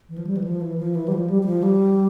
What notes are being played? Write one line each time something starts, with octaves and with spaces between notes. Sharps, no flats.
E3
F3
G3
E3
F3
E3
F3
E3
G3
F3
G3
G3
F3
G3